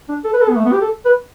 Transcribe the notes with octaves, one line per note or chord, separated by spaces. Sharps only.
D4
A4
B4
A4
B3
A3
B3
G4
A4
B4